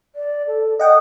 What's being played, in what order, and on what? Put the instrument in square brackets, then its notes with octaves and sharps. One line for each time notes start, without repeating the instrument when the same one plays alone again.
[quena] D5
A4
[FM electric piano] D#5 F#5 G5 [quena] D#6